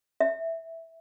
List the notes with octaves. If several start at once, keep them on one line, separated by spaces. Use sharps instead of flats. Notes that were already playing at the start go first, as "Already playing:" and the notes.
E5